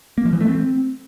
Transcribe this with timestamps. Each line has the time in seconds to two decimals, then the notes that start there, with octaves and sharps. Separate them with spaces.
0.18 A#3
0.25 F3
0.33 E3
0.41 A3
0.48 C4